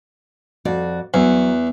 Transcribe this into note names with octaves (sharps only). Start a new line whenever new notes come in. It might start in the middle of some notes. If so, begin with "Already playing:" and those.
F2 F#4 D5
E2 F#3